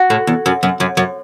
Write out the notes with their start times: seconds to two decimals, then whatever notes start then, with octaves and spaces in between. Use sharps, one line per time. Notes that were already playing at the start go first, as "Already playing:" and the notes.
Already playing: F#4
0.10 A2
0.27 E2
0.46 F#2
0.63 F#2
0.80 F#2
0.97 F#2